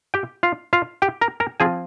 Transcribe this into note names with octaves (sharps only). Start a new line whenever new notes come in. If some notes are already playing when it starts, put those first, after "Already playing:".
G4 G5
F4 F5
F4 F5
G4 G5
A#4 A#5
A#4 A#5
F3 C4 F4 G#4 G#5